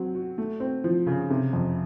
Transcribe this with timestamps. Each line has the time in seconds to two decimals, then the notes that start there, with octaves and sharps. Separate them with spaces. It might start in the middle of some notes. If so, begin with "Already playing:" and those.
Already playing: F#3 C4
0.15 F#4
0.38 A3
0.60 C4
0.84 F3
1.07 C#3
1.30 C3
1.53 F2